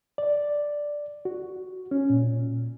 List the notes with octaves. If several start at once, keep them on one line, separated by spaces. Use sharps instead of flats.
D5
F#4
C#4
A#2